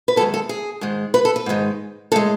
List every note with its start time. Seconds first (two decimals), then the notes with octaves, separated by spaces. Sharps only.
0.08 B4
0.16 F#2 D#3 G#3 A4
0.34 A4
0.49 G#4
0.81 G#2 D#3 G#3
1.14 B4
1.25 A4
1.36 B4
1.46 G#2 D#3 G#3
2.12 A2 G#3 A4